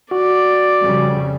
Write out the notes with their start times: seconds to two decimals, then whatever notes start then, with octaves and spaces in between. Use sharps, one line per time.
0.11 F#4 D5
0.82 F2 C#3 G3